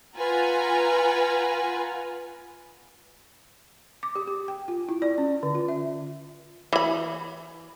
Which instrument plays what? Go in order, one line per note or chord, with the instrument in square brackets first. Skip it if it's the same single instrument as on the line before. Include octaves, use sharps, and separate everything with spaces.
[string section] F4 B4 F#5 G#5 A#5
[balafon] D6
G4
G4
G5
F4
E4
D5
C#4
D3
F4
E5
[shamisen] E3 B5